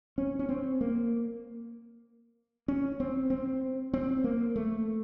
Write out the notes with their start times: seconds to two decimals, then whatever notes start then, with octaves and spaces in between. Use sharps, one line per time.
0.18 C#4
0.39 C#4
0.49 C4
0.81 A#3
2.68 C#4
3.00 C4
3.30 C4
3.94 C4
4.24 A#3
4.56 A3